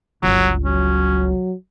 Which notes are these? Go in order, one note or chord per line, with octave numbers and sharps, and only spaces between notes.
G1 C#2 F#3
F#3 C#4